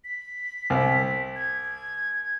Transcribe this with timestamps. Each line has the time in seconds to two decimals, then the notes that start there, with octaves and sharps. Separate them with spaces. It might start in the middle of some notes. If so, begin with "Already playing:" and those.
0.05 B6
0.70 C2
1.36 G#6